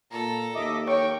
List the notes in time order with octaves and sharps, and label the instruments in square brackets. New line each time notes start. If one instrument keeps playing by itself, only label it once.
[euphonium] A#2 [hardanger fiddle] A4 A#5
[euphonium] D#2 [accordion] D#5 E5 D6
[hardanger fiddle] A#4 [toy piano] C#5 [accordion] G5 C#6